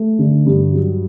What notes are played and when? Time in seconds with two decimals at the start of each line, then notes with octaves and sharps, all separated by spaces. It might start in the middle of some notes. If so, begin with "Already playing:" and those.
Already playing: A3
0.19 D3
0.46 G2
0.73 F#3